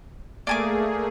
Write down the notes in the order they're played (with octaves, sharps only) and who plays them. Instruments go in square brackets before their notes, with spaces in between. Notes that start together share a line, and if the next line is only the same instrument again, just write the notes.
[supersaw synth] A3 A#3 G#4 [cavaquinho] D5 G#5 D6